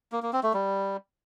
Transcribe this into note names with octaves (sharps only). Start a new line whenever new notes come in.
A#3
A#3
C4
A3
G3